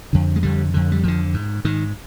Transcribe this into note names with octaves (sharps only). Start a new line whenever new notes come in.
F2 D3
G#3
F2 D3 G3
F2 D3
G3
F2 D3 F3
G#2
G#2 D#3